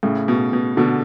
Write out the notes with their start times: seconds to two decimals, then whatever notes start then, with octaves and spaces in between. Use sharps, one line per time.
0.03 A2 C#3
0.28 B2
0.53 B2
0.77 B2 D3